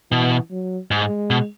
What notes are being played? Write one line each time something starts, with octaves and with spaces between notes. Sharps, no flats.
B2 E3
F#3
G#2 G#3
B2